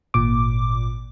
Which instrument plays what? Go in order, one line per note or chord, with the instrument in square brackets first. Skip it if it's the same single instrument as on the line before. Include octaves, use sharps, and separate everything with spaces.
[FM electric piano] G#1 A#2 D6